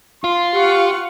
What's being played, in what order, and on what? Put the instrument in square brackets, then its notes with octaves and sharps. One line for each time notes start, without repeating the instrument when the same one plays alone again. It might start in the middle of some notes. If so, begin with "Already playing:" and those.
[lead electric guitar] F4 [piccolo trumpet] C6
[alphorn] G4 [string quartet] F5 F#5 C#6